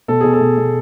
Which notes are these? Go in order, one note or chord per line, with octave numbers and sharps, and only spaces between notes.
B2 A4
B2 G#4
A4
B2
B2